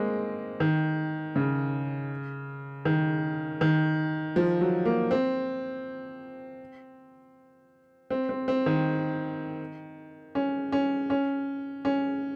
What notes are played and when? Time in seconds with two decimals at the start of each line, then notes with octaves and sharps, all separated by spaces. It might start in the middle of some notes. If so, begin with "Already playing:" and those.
Already playing: G#3 A#3 C4
0.60 D#3
1.36 C#3
2.85 D#3
3.61 D#3
4.36 F3
4.61 F#3
4.85 A#3
5.11 C4
8.10 C4
8.29 C4
8.48 C4
8.66 D#3
10.35 C#4
10.72 C#4
11.10 C#4
11.85 C#4